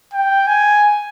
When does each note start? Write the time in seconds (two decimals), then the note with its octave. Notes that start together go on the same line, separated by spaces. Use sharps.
0.13 G5
0.47 G#5